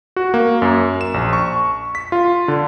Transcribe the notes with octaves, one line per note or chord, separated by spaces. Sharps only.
F#4
A#3
F#2
E7
A#1
C#6
B6
F4
D3